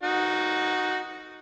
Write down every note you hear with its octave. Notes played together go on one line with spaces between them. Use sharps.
D#4 F#4